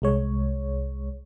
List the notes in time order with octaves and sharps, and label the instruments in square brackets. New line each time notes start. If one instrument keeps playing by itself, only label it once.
[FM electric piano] C2 G#3 C#5